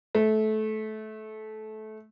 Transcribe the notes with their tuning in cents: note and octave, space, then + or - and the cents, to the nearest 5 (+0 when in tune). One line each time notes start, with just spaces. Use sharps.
A3 -20